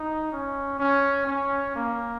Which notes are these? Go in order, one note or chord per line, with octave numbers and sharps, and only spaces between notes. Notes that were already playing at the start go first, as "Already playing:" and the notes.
Already playing: D#4
C#4
C#4
C#4
A#3